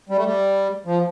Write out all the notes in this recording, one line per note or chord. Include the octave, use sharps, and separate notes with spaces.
G3
A3
G3
F3